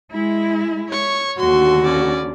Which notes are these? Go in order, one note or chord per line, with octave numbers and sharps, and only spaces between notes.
G#3 E4
C#5 C#6
D#2 D3 F#4 C6
C#4 D5